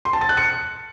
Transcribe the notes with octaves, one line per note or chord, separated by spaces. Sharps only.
C6
A5
A6
F#6
C#7